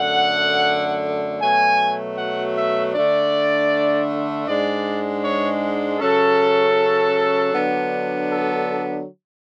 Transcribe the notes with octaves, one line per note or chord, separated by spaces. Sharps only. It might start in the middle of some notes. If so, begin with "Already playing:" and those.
Already playing: F#2 D3 A3 F#5
B2 F#3 A3 G#5
F#5
E5
D3 A3 D4 D5
G#2 G#3 D4 D5
C#5
C#3 F#3 C#4 A4
D3 F#3 B3 D4
A4